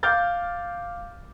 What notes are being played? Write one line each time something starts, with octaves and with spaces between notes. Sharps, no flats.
F5 D6 F6 G6 A6